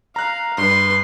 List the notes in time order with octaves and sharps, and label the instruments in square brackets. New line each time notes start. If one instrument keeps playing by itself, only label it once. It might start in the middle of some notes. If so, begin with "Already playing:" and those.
[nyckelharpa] F5 [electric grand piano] A#5 F#6
[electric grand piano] G2 [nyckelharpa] B4 C6